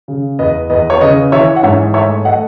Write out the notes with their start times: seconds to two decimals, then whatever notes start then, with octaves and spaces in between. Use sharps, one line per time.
0.08 C#3
0.39 E2 B4 D#5
0.70 E2 B4 D#5
0.90 C#5
1.01 C#3 B4 D#5
1.32 E3 C#5 E5
1.56 F#5
1.63 G#2 C#5 E5
1.94 A3 C#5 E5
2.25 A3 D#5 F#5